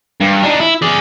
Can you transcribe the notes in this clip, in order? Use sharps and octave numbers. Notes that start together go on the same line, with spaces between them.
G2
D4 D#4
E4
G#4 D5